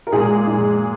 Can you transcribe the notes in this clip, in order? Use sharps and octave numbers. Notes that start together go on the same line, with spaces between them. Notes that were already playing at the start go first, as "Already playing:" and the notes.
A#4
A#2 G#3 G#4
A#2 G#3